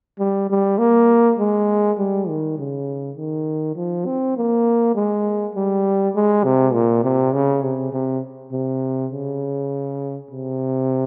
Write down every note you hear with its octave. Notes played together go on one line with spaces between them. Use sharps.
G3
G3
A#3
G#3
G3
D#3
C#3
D#3
F3
C4
A#3
G#3
G3
G#3
C3
A#2
C3
C#3
C3
C3
C3
C#3
C3